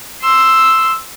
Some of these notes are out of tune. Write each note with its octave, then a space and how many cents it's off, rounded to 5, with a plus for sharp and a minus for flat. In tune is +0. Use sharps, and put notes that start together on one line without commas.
C6 +0 E6 +0